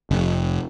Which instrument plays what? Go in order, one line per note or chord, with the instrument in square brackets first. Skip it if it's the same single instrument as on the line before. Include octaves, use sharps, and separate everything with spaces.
[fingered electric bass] F1